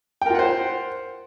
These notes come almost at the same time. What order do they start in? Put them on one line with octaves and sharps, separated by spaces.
G5 A#4 F4 F#5 C5